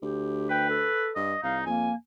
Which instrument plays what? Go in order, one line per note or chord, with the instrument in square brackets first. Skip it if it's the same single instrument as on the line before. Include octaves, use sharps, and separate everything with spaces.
[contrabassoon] D2 [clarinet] G4
[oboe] B4 [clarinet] G5
[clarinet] A4
[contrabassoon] G2 [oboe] D#5
[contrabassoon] C2 [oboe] D#4 [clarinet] F5
[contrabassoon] F2 [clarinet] A#3 [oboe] G#5